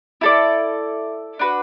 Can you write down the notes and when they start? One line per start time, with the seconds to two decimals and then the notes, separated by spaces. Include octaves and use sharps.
0.21 E4 A4 D5
1.39 D4 F#4 B4